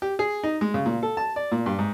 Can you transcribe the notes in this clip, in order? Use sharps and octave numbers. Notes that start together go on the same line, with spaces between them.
G4
G#4
D#4
G#3
C#3
A#2
A4
A5
D5
A#2
G2
G#2